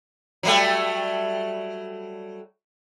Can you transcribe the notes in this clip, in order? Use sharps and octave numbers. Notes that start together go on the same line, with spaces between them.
F#3 G3 A3